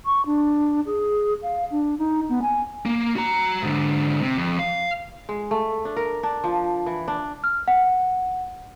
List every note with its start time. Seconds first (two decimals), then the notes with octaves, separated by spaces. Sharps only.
0.05 C#6
0.26 D4
0.86 G#4
1.42 F5
1.71 D4
1.98 D#4
2.29 B3
2.42 G#5
2.86 A#3
3.16 F#4 A#5
3.62 G#2 D3
4.22 C3
4.37 F2
4.59 F5
5.29 G#3
5.51 A3
5.85 D4
5.96 A#4
6.23 D4
6.44 F3
6.86 E3
7.08 D4
7.44 F6
7.68 F#5